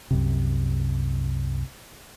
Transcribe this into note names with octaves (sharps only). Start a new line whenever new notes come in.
C2 F#2 C3